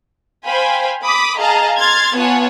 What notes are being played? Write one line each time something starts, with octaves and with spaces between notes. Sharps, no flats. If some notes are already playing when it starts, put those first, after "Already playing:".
C5 F5 G5 G#5 B5
B5 D6 D#6 B6
G#4 D#5 F5 A5 A#5
C6 F6 G#6 A6
B3 F4 C#5 F#5 G#5 A5